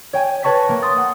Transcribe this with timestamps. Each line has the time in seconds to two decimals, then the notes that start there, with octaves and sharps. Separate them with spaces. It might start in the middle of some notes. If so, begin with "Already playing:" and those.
0.13 C#5 G5 G#5
0.43 B4 C#5 A5 C#6 A#6 B6
0.69 A#3
0.82 C6 D#6 A6
0.97 F#5